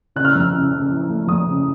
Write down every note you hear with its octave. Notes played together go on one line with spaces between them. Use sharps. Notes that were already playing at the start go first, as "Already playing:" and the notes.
C#3 F#6
F6
E6
F2 F6
C#3
C#3
E3
A3
F2 D#6
C#3